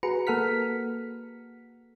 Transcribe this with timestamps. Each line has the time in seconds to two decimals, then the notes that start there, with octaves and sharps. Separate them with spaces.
0.03 F#4 G#4 B4 A#5 C#7
0.27 A#3 A4 F#5 F6 B6